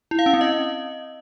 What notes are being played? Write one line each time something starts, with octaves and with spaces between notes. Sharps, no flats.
E4
F5
C#4
C4
D#5